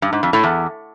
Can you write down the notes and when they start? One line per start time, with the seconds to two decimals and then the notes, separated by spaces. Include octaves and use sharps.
0.02 G2
0.13 G#2
0.23 F2
0.33 A2
0.43 E2